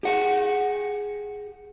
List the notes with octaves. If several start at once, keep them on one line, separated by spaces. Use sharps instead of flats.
G4 G#4 F#5